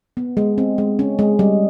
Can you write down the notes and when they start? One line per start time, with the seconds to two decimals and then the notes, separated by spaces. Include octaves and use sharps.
0.17 B3
0.37 G#3
0.58 C4
0.78 G#3
0.99 C#4
1.19 G#3
1.39 G3